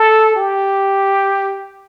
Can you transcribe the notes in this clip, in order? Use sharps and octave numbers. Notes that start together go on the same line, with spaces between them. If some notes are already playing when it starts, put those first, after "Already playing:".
Already playing: A4
G4